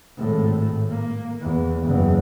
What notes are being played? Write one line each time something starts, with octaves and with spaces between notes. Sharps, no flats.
G#1 A2
A#3
E2
F#1 E2